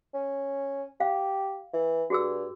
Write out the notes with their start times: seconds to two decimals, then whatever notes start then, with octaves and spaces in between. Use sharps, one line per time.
0.14 C#4
1.00 G4 F5
1.74 E3
2.10 G2 F#4 G#4 E6